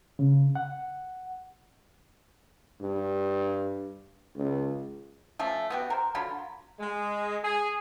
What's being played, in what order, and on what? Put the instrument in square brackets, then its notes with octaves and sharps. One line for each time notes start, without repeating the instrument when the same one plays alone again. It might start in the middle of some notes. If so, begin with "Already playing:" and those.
[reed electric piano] C#3
F#5
[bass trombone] G2
C#2
[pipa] F3 A3 C#4
B3 F#4 G4
A#4 C5
D3 F#3 F4 B5
[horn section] G#3
G#4